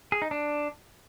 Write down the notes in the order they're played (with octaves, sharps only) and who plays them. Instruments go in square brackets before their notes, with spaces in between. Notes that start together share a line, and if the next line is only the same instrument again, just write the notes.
[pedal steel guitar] G#4
D#4
D4